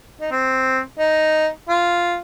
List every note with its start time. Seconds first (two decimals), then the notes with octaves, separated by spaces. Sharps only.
0.21 D#4
0.31 C4
0.99 D#4
1.69 F4